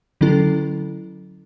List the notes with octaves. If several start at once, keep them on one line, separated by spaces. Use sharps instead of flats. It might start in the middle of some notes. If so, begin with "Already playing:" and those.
D3 F#3 C#4 E4 A4